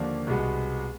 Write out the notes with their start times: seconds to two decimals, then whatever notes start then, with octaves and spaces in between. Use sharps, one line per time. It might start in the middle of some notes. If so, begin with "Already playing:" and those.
Already playing: D#2 D3 F3 A#3 D4
0.27 C2 B2 G#3 B3